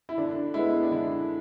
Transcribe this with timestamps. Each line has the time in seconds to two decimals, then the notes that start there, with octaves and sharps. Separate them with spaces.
0.09 E4
0.18 D3 D4
0.54 G#3 B3 E4
0.83 D4
0.91 D3 E4